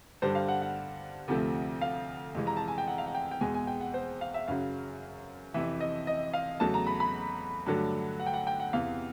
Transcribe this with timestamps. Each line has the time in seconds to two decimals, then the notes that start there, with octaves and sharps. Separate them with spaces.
0.22 G2 D3 G3 C5
0.35 F5
0.48 F#5
0.62 F#5
1.28 D2 C3 F3 A3
1.81 F5
2.35 F2 C3 E3 G#3
2.47 A#5
2.57 A5
2.68 G#5
2.78 G5
2.88 F#5
2.98 F5
3.06 F#5
3.15 G5
3.31 G5
3.41 E2 B2 G#3 G#5
3.55 G#5
3.67 G5
3.81 F#5
3.94 C5
4.21 F5
4.34 E5
4.48 F#2 C#3 F#3 F5
5.54 F2 C3 E3 E5
5.80 D#5
6.07 D#5
6.33 F5
6.60 E2 C#3 F#3 A3 A5
6.74 A#5
6.87 B5
7.00 B5
7.66 G2 D3 F#3 A3
8.20 F#5
8.26 G5
8.34 F#5
8.47 G5
8.60 F#5
8.73 E2 C3 E3 F5